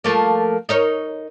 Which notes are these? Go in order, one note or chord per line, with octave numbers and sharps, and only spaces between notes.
F3 A3 A#3
D#4 A#4 C#5